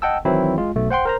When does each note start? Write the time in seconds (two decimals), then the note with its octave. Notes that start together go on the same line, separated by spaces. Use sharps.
0.02 D#5 F#5 G5 A5 E6
0.25 D#3 E3 F#3 C4 E4
0.58 G#3 F4
0.76 B1 B2 A3
0.90 C5 F#5 G5 C6
1.05 A#4 C5 A#5